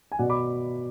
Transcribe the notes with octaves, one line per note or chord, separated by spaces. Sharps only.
G#5
B2 D5 F#5
B5 D6